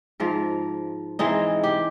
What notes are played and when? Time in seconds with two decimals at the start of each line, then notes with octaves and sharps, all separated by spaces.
0.20 G#2 F3 A#4
1.19 E3 G#3 C4 D#4
1.64 G4